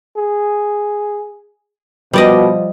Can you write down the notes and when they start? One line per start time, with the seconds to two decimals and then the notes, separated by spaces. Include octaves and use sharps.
0.16 G#4
2.13 B2 F3 G3 D5 D#5